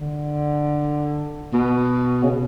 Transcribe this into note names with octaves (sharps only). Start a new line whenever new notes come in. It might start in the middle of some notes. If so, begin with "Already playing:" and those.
D3
B2
C#3
B2